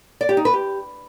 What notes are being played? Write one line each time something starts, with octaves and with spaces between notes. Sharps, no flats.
D5
G4
D#4
B4
G4